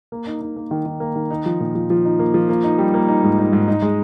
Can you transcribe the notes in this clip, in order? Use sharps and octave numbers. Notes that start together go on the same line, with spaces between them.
A#3
D#4
D#4
A#3
D#3
D#3
A#3
D#3
D#4
F3
A#2
F3
F3
D#4
A#3
F3
A#3
D#4
G3
A#3
D#4
G#2
D#4
G#2
D#4
G#3